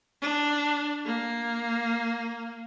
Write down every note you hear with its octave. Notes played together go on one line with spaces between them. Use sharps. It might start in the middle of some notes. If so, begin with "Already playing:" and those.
D4
A#3